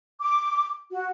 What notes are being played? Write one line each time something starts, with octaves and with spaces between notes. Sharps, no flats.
D6
F#4